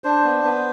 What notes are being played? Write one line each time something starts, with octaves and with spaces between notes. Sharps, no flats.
D4 C5
B3
B3